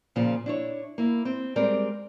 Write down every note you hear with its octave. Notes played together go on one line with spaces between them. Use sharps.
A#2 C#3 F3
D4 E4 C#5
A#3 E4
C4
G3 G#3 C4 A#4 D5